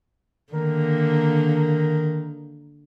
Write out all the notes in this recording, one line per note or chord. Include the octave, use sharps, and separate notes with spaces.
D3 D#3 A#3